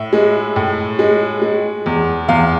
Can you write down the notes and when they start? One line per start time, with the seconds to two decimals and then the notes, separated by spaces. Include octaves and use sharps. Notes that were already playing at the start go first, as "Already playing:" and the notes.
Already playing: A2 E5
0.13 G#3
0.56 A2
0.99 G#3
1.42 G#3
1.86 E2
2.28 E2 F5